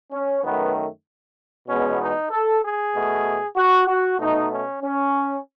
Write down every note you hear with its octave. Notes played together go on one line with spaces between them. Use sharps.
C#4
F#2 D#3 A3 B3
E2 B2 G#3 B3 C#4
D#4
A4
G#4
B2 A3
F#4
F#4
B2 A3 D#4
C#4
C#4